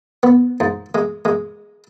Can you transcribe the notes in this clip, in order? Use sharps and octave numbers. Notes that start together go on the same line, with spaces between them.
B3
G#2
G#3
G#3